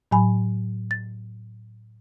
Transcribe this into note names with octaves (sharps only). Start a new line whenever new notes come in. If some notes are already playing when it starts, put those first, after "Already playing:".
A2 F#3 G#5 B5
A6